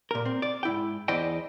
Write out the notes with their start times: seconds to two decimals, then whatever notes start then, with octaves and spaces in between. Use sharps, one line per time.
0.11 A#2 A#4
0.25 C4
0.42 D5
0.63 G#2 E4 G5
1.08 E2 E4 C5 D5 D#5 G5